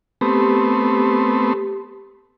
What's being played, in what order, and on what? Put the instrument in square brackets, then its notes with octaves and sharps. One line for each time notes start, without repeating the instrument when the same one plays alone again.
[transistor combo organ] A3 B3 C4 [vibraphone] G4